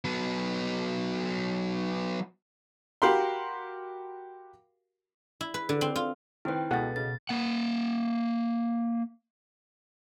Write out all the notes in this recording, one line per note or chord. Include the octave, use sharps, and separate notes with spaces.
F#3 B3
F#4 G4 A#4 F5 B5 C6
E4
B4
D3
C4
F4
D#3 C4 E4 B4 G5
C#2 B2 G#3 A4 F#5 A6
C#3 A6
A#3 F#5